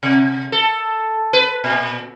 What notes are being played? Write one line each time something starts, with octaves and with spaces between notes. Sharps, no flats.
C3
A4
B4
A#2